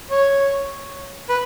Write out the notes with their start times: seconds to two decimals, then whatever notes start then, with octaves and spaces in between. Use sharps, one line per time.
0.11 C#5
1.29 B4